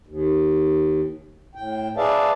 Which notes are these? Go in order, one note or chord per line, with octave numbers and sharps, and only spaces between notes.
D#2
A2 G5
G#4 B4 D5 E5 F5 A5